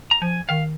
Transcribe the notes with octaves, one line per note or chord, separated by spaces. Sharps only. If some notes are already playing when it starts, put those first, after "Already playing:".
A#5
F3 G#5
D#3 F5